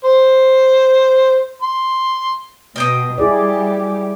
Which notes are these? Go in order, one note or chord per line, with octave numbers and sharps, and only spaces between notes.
C5
C6
B2 D#5 G5 D#6
G3 E4 G4 G#4 D5